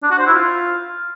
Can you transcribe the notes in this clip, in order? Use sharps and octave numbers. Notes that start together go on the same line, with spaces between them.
D4
F#4
C5
E4
F4